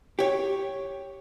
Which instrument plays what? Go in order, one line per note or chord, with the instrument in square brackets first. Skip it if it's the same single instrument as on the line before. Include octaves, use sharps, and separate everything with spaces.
[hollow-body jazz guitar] G4 C#5